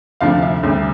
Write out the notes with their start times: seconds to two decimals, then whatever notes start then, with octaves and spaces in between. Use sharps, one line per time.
0.21 D2 C3 F3 A3 D4 F5
0.42 E5
0.63 D2 C3 G3 C4 E5